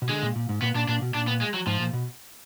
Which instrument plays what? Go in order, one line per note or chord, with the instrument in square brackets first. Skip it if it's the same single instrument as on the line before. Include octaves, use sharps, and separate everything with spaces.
[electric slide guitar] B2
[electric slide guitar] D3 [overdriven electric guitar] G#3
[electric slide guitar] A#2
A#2
G#2
[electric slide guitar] A#2 [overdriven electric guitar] B3
[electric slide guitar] A#2 [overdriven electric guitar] D4
[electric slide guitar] A#2 [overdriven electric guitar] D4
[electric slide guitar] B2
[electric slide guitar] A#2 [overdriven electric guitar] D4
[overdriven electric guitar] B3
G#3
F#3
[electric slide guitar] G#2 [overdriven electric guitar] F3
[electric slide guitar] A#2
B2